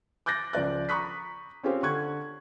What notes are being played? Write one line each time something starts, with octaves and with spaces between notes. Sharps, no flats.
D6 F#6 G6 A6 A#6
C#2 F3 D5 F#6
A#5 B5 C#6 D#6 F#6 B6
C4 C#4 F4 G4 C5
D3 C#6 F#6 G#6